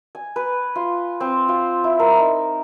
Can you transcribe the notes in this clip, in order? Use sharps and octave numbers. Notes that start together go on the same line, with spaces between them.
G#5
B4
F4
C4
F4
E4
A#4
D#4